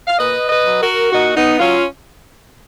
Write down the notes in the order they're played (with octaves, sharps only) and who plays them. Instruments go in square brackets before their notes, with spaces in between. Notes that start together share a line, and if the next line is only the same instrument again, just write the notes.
[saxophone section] F5
A#2 B4 D#5
B4 D#5
F#3
F#4 A#4
A#2 D#4 F#4
B3 D#4
F#3 C#4 F4